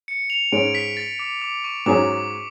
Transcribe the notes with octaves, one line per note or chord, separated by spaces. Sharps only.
C#7
F7
G#2 G#3 C#4 D7
B6
A6
D6
D6
C#6
G#2 F#3 C#4 G#4 D6